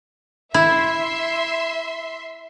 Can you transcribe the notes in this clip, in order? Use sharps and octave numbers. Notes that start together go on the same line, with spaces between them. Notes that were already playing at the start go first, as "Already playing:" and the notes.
E4 E5 C6